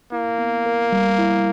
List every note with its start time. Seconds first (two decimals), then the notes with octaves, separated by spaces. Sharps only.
0.11 A#3 E4
0.38 B3
0.66 A#4
0.92 G3
1.19 E4